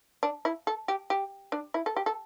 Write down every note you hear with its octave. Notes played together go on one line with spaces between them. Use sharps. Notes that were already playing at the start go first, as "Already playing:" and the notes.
D4
E4
A4
G4
G4
D4
E4
A4
G4
A4